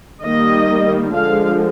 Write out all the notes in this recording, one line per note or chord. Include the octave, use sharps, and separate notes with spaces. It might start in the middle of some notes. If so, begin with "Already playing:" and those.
D#3 G3 A#3 D#5
D3 F3 G#3 F5